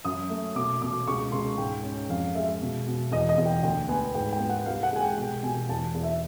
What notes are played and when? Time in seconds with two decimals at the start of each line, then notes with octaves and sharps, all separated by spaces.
0.05 F#2 D#6
0.29 A3
0.55 B2 D6
0.81 B2 D6
1.07 C#2 C#6
1.32 C#2 C6
1.58 G#2 G5
1.84 C#4
2.09 F2 F5
2.35 G#3 E5
2.61 B2
2.87 B2
3.12 E2 D#5
3.29 D#5
3.38 E2
3.46 G5
3.63 D2 G5
3.89 B3 G#5
4.15 G#2 G5
4.33 G5
4.40 B3
4.49 F#5
4.66 C2 F5
4.83 F#5
4.92 G#3 G#5
5.01 G5
5.18 B2 G5
5.43 B2 G#5
5.69 E2 A5
5.94 E2
6.03 E5